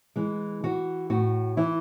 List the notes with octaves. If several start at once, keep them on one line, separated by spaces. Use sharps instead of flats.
E3 G#3
E3 F#4
A2 F#4
E3 E4